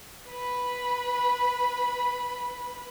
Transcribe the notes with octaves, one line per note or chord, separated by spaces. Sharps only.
B4 B5